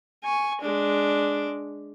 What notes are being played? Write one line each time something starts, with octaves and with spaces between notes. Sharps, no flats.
G#5 C#6
G#3 D4